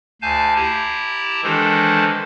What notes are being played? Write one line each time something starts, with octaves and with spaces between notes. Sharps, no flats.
D2 F5 G#5 A5 G6
E4 G4 A5 A#5
D#3 E3 G#3 D4 A4 C5